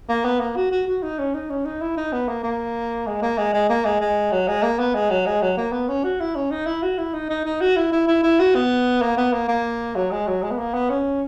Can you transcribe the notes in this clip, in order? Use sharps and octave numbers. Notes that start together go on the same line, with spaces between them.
A#3
B3
A#3
F#4
F#4
F#4
D#4
C#4
D#4
C#4
D#4
E4
D#4
B3
A#3
A#3
G#3
A#3
G#3
G#3
A#3
G#3
G#3
F#3
G#3
A#3
B3
G#3
F#3
G#3
F#3
A#3
B3
C#4
F#4
E4
C#4
D#4
E4
F#4
E4
D#4
D#4
D#4
F#4
E4
E4
E4
E4
F#4
B3
A#3
B3
A#3
A#3
F#3
G#3
F#3
G#3
B3
A#3
B3
C#4